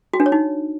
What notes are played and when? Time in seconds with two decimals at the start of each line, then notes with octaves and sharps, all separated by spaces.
0.14 F#4
0.20 D4
0.26 C#5
0.32 D#4